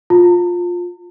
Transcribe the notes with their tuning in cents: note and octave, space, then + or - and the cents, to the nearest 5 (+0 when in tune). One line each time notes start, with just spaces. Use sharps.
F4 +15 A5 +45